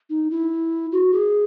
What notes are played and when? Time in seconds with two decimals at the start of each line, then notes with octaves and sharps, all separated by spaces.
0.10 D#4
0.31 E4
0.92 F#4
1.13 G#4